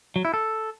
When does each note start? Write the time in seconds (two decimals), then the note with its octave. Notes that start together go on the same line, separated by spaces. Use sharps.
0.16 F#3
0.25 E4
0.34 A4